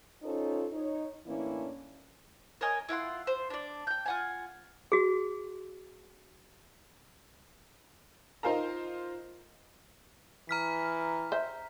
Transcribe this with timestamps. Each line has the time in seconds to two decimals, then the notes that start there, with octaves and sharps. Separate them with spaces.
0.23 C#4 D#4 F4 A4 C5 C#5
0.73 D#4 C#5
1.26 A2 E3 A#3 C#4 D4 E4
2.61 A#4 C#5 D#5 G#5
2.89 E4 F4 F#5 C6
3.27 C5
3.50 D4 D5
3.87 G5 G6
4.06 F4 F#5 G#5
4.92 F#4 G#4
8.43 D#4 F4 A#4 C5 F5 A#5
10.49 E3 A#5 F6 B6
11.32 C5 E5